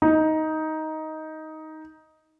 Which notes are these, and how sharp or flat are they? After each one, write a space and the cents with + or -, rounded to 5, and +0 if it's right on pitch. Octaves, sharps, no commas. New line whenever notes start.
D#4 +10